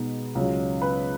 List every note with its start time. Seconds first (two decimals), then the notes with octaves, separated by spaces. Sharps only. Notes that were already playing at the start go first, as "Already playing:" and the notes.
Already playing: B2 G#3 B3 D#4
0.35 C#2 C#3 F#3
0.82 B4